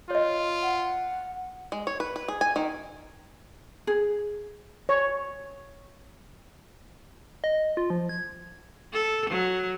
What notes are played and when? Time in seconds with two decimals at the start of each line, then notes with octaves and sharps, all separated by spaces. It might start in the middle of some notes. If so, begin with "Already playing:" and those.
0.10 F4 C#5 D#5
0.62 F#5
1.72 G#3
1.87 C#5
2.00 B4
2.16 B4
2.28 G#4
2.41 G#5
2.56 D#3
3.87 G#4
4.89 C#5
7.44 D#5
7.77 F4
7.90 F3
8.09 G#6
8.93 A4
9.30 F#3